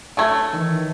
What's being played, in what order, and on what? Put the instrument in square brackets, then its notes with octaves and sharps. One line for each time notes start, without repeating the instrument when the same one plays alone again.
[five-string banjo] F#3 A3 [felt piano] A5 G#6
[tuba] D#3 [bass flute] E3